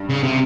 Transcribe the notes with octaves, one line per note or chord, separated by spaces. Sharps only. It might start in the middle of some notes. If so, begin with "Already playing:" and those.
Already playing: G2 G3
C#3
C3